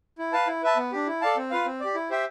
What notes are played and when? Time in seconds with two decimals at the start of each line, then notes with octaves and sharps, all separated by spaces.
0.19 E4
0.33 B4 F5 A5
0.47 E4
0.63 B4 E5 A5
0.77 B3
0.92 D4 G4
1.07 E4
1.21 A4 D5 F5 A5
1.37 C4
1.51 F4 B4 F5
1.66 C4
1.80 G4 D5
1.95 E4
2.10 G4 C5 E5 G5